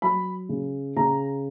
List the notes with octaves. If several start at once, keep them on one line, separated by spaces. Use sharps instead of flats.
F#3 B5
C#3
C#3 A#5